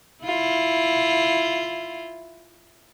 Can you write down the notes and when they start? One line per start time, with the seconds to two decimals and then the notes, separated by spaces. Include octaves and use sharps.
0.24 E4 F4